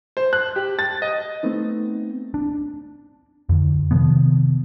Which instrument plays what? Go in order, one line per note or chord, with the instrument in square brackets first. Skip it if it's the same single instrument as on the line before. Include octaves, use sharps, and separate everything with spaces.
[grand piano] C5
F#6
G4
A6
D#5
[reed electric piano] A3 B3 C4 D#4
[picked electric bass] D4
F2 D3
C3 D#3 F3 B3